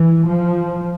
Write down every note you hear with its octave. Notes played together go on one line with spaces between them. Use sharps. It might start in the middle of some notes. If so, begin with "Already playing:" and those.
Already playing: E3
F3